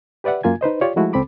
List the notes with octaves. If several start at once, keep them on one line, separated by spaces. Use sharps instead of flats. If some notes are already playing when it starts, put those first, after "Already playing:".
G4 B4 D5 E5 F#5
F#2 A#3 F4 G#5 G#6
D#4 B4 C5 D#5
F4 G4 C#5 D5
F3 G#3 A3 E4 F#4
C#2 C4 A4 B5 D6